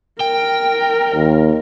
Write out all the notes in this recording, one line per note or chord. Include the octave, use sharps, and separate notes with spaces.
A#4 G5
D#2